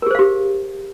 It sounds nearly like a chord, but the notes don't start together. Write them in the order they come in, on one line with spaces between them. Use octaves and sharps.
A#4 G#4 C5 F5 G4